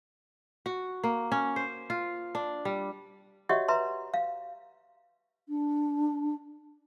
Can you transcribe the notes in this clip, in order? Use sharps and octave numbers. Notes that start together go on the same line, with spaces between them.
F#4
A#3
C#4
C5
F4
D4
G3
F#4 G4 C#5 D#5 E5 F#5
B4 E5 A#5 C6
F5
D4